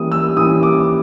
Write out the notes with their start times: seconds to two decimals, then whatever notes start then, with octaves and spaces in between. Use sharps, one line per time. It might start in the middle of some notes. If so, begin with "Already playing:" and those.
Already playing: E3 G3 A#3 C#4 E4 D#6
0.12 E6
0.37 E3 G3 A#3 C#4 E4 D#6
0.63 D6